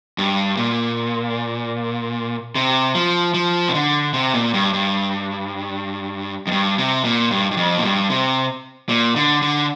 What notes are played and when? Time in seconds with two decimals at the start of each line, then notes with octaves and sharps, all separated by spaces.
0.18 G2
0.57 A#2
2.55 C3
2.95 F3
3.34 F3
3.68 C3
3.74 D3
4.14 C3
4.34 A#2
4.54 G2
4.73 G2
6.47 F2
6.51 G2
6.78 C3
7.05 A#2
7.31 G2
7.51 G2
7.57 F2
7.78 A#2
7.84 G2
8.10 C3
8.89 A#2
9.16 D3
9.42 D3